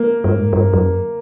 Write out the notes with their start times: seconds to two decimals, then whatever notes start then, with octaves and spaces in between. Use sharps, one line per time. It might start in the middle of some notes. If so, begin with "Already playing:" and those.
Already playing: A#3
0.24 G2
0.33 G#2
0.53 G2
0.73 F#2